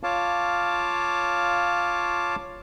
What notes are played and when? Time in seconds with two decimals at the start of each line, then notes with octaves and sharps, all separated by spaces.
0.03 F4 C#5 F5 A5 D6